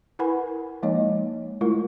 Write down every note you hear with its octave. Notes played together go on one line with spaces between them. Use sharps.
E4 A#4 B4 F#5 G#5 B5
F3 G#3 A#3 D#4 C#5 D#5
G#3 A3 E4 F4 A#4